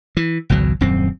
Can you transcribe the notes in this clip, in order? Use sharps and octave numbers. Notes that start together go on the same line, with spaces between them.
E3
G#1 C#2 B2 F#3
D#1 F#2 C4